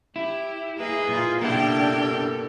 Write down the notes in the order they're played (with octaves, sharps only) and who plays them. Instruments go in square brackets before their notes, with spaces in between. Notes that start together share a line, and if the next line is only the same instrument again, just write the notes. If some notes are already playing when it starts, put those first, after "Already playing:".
[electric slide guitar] E4 [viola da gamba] G4
[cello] A#3 [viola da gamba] G#4 B4 D#5
[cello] A#2 F4
[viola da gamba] B2 G4 A4 [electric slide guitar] A#3 E4 [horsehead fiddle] D4 [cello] G5